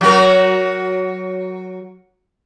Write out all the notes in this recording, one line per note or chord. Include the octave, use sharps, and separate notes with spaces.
F#3 F#4 A#4